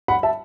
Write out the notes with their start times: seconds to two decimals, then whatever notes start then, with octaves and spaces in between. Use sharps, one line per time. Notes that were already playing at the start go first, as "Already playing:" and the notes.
0.08 F#5 B5
0.23 E5 A5